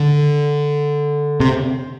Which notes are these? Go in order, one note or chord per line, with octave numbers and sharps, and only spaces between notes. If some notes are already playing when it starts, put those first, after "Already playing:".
Already playing: D3
C3